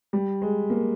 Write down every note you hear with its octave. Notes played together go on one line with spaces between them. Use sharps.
G3
G#3
A#3